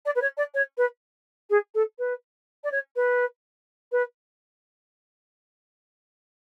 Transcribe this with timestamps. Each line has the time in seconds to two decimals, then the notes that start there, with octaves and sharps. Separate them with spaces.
0.06 D5
0.16 B4
0.22 C#5
0.37 D5
0.54 C#5
0.78 B4
1.50 G#4
1.75 A4
1.99 B4
2.64 D5
2.72 C#5
2.96 B4
3.92 B4